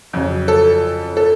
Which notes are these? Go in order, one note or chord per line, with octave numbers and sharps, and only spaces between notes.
F2 C#3 F#3
A4
A4